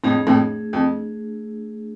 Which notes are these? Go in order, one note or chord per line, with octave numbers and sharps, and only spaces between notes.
F2 A2 A3 D4 G#4
F2 A2
F2